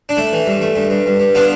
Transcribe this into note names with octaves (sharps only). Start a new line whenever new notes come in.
D4
A3 E4
E3
G2
A3
G2
G2
G2
G2
B3 D4 F4